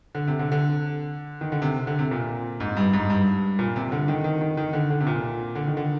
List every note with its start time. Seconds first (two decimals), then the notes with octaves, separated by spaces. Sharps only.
0.15 D3
0.27 C3
0.39 D3
0.52 D3
1.41 D#3
1.52 D3
1.62 C3
1.87 D3
1.99 C3
2.11 A#2
2.60 G#2
2.77 G2
2.93 G#2
3.10 G2
3.59 A#2
3.76 C3
3.92 D3
4.08 D#3
4.24 D#3
4.41 D#3
4.57 D#3
4.73 D3
4.90 D3
5.00 C3
5.07 A#2
5.55 D3
5.67 D#3
5.77 D3